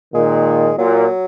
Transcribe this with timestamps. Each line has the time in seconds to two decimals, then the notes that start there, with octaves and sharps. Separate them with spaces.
0.14 A#2 D#3 G#3
0.78 A#2 F#3